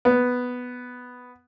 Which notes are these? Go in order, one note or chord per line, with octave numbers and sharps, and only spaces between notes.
B3